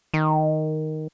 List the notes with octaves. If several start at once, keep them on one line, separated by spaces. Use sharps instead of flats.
D#3